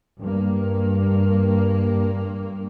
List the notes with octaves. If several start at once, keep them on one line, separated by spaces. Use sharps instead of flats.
G2 A#3